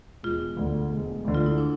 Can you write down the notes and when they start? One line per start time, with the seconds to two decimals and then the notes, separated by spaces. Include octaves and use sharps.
0.23 E1 F4
0.57 D2 D3
0.91 E1
1.25 D2 D3
1.34 F4
1.46 E4
1.58 D4